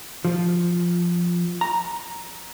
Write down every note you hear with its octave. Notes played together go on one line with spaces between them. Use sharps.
F3
A#5